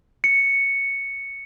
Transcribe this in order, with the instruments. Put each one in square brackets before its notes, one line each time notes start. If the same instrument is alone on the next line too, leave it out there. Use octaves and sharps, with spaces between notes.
[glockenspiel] C#7